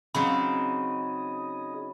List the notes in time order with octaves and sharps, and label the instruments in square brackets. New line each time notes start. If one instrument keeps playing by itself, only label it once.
[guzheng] C#3 F#3 C4 [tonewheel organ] D#4 G#4 D#5 [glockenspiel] B5